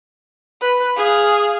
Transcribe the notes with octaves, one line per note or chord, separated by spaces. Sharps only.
B4
G#4 F5